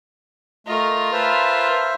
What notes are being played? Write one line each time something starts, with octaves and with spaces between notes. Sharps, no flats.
A3 F4 A#4 D#5
B4 C5 E5 A5 F6